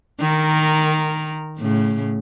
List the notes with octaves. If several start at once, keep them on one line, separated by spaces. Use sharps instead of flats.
D#3 A#4
A2 C#3